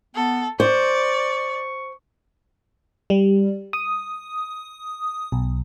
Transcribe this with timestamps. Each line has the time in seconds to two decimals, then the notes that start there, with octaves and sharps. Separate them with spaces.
0.15 B3 A4
0.60 C5 D5 C#6
3.10 G3
3.73 D#6
5.32 B1